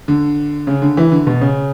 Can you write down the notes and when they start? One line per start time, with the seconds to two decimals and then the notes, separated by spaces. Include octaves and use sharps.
0.08 D3
0.67 C#3
0.82 D3
0.97 E3
1.12 D3
1.27 B2
1.41 C#3